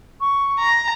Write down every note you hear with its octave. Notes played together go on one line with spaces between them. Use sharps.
C#6
A#5